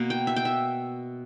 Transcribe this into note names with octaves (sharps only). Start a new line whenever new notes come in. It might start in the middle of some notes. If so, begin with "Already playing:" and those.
Already playing: B2 A#3
G5
E5
G5
E5